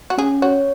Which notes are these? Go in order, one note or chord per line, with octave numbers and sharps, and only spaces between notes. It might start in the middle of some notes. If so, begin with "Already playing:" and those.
F#4
C#4 G#4
F#4 C#5